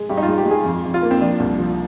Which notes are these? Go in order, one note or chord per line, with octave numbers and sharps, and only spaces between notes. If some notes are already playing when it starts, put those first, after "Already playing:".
Already playing: G#3
G2 G4
D#4
F4
G#3
G4
G#3 G#4
F2
F2
F4
A#3
C4
F3 D4
C2
F3